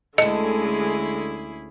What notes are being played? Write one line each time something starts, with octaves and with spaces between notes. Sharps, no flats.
D2 D3 G#3 C#4 E4 G#4 A4 D#5